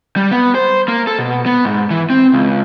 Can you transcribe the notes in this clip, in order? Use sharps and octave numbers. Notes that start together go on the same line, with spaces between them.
G3
B3
C5
A#3
A4
B2
B3
G#2
E3
C4
C#2